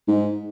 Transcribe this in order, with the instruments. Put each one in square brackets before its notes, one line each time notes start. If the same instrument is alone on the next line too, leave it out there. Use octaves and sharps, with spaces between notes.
[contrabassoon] G#2